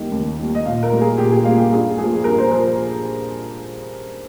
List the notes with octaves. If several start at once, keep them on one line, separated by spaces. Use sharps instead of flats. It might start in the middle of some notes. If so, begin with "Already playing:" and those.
Already playing: D#2 D#3 G3 A#3
D#2
D#3 G3 A#3
D#5
A#2 F5
A#4
G3 A#3
G#4
A#2 G4
G#4
G3 A#3 F5
G4
G2 G#4
F3 A#3 G#4
G2 A#4
C5
F3 A#4